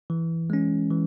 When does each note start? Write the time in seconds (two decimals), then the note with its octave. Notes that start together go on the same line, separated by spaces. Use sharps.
0.10 E3
0.50 G#3 C#4
0.91 E3